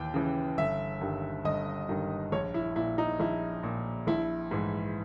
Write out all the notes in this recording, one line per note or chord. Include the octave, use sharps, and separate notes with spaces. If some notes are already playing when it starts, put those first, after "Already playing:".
Already playing: D#2 E3 G5
C#3 E3
G1 E5
G2 D#3
G1 D#5
G2 D#3
A#1 C#5
E4
A#2 E4
D#4
A#1 E4
A#2
A#1 E4
G#2 E3